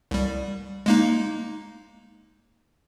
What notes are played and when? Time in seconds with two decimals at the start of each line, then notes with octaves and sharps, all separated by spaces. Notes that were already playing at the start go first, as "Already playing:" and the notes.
0.11 C2 G3
0.86 G#3 A#3 D#4